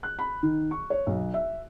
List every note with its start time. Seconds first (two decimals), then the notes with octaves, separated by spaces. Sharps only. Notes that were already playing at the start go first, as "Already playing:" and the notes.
0.03 F#6
0.19 B5
0.43 D#3
0.71 C#6
0.90 C#5
1.07 B1
1.34 E5